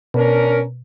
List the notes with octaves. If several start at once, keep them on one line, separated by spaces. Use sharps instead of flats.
B2 C#4 D4 A#4